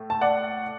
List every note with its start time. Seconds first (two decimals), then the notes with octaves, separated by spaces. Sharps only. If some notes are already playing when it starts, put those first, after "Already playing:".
Already playing: A2 A3
0.10 A5
0.21 D5 F#5